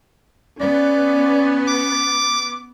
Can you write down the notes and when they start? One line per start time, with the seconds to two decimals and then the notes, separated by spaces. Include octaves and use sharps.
0.60 B3 C#4 D5
1.67 D6